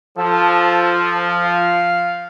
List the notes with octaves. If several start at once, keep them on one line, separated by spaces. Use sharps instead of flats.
F3 A4
F5